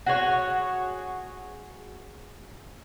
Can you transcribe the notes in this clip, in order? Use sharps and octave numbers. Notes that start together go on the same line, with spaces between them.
F#4 G#4 C#5